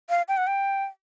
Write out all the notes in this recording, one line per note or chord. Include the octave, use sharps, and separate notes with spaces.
F5
G5
F#5
G5